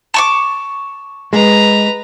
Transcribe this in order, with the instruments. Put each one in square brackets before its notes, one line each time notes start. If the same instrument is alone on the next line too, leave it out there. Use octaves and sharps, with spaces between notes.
[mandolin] A5 C#6 D6
[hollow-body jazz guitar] G#3 [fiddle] B4 A#5